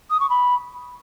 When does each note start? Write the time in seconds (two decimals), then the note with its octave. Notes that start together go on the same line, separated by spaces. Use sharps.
0.11 D#6
0.20 C#6
0.30 B5